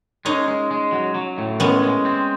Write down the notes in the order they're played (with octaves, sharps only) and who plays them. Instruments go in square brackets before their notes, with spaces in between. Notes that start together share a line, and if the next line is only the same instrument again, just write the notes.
[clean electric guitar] G#3 [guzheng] C#4 D#4
[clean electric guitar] G#3
G#3
F#3
F#3
A2
[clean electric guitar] G#3 [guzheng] B3 C#4
[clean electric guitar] G#3
C4